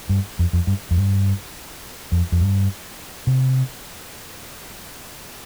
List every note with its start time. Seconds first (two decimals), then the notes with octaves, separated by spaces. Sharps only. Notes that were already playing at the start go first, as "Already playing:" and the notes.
0.09 G2
0.39 F2
0.53 F2
0.67 G2
0.91 F2
0.97 G2
2.12 F2
2.32 F2
2.41 G2
3.27 C3